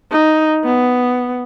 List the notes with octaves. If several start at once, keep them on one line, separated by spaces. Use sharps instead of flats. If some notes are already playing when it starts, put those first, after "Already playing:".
D#4
B3